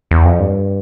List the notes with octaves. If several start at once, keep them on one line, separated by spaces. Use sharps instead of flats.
E2
F2
G2